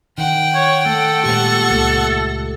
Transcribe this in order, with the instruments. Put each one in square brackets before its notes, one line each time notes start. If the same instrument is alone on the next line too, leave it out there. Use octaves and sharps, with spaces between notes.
[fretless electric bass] D#3 [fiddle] F#5 G5
[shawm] C#5
[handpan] A3 [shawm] A4
[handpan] A#2 G#3 G4 [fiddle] F#5 C#6
[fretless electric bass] C#2 [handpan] A3